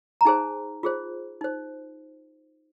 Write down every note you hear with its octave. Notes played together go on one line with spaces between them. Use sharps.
A#5
D#4 G#4 C5 G#5
F4 G#4 C5
D#4 C5